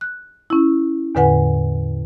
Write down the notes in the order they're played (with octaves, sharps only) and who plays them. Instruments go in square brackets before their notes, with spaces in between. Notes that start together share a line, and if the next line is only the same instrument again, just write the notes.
[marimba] F#6
C#4 E4
E2 A2 D3 B4 F#5 G#5